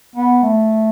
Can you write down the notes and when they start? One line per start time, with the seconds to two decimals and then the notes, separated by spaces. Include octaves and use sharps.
0.16 B3
0.43 A3